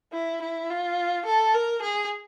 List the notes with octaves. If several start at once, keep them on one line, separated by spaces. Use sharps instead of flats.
E4
E4
F4
A4
A#4
G#4